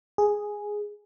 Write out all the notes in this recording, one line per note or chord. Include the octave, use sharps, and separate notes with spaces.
G#4